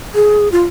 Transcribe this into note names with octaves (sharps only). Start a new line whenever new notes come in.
G#4
F4